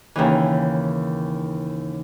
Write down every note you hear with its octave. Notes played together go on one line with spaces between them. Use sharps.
D#2 C#3 E3